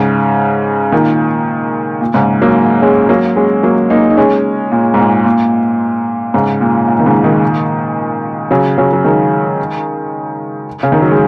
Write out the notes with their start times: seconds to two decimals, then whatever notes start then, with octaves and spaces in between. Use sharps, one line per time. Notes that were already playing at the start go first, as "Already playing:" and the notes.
Already playing: G#2 C#3
0.92 A#2 D#3
2.01 A#2
2.14 G#2 C#3
2.42 F#3 A#3
2.82 G#3 C#4
3.09 F#3 A#3
3.36 G#3 C#4
3.63 F#3 A#3
3.90 A#3 D#4
4.10 D#4
4.17 G#3 C#4
4.72 A#2
4.94 G#2
4.99 A#2
5.25 A#2
6.34 G#2 C#3
6.61 A#2
6.88 A#2
6.99 D#3
7.06 G#2 C#3
7.24 A#2 D#3
8.51 C#3 F#3
8.78 C#3 F#3
8.93 F#3
9.04 D#3 G#3
10.83 C#3
10.92 D#3
11.02 F#3
11.12 G#3